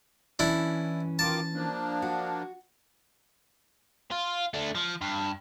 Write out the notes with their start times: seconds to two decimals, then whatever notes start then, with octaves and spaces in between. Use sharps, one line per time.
0.39 E3 C#4 D4 E4
1.19 D#3 F4 A5 D6
1.54 F3 A#3 D4
2.02 F#4
4.11 F4
4.54 A3 D4
4.75 F3
5.01 G2